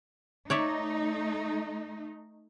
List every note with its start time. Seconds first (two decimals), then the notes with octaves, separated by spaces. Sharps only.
0.50 A3 D#4 C#5 D5 E5